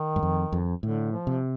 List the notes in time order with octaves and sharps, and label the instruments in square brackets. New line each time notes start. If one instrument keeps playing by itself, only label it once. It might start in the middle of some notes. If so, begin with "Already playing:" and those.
Already playing: [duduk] D#3
[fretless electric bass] G2
F2
F2
[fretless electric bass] A2 [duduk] D3
[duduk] F3
[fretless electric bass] C3